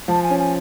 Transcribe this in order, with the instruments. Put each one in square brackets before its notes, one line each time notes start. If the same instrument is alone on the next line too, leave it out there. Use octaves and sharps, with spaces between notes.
[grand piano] F3 [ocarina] A5
[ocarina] G#5
[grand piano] C#4
[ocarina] G#5